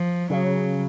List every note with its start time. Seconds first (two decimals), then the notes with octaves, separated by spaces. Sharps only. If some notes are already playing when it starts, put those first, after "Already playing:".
Already playing: F3
0.30 C#3 F#3